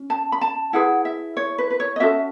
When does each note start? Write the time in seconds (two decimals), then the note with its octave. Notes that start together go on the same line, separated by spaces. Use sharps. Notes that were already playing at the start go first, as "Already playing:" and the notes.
Already playing: C#4
0.10 A5
0.32 B5
0.41 A5
0.73 E4 G#4 B4 F#5
1.05 E5
1.37 C#5
1.58 B4
1.70 B4
1.80 C#5
1.96 D#5
2.00 C#4 F#4 A4 E5